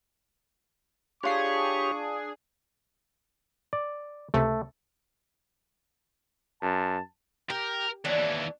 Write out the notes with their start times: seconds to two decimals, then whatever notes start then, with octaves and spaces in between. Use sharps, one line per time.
1.23 D4 F4 G4 G#4 C#5 C6 C#6
3.73 D5
4.34 C#2 C3 A3
6.63 F#2 A5
7.50 G4 A#4
8.05 D#2 E3 D4 C#5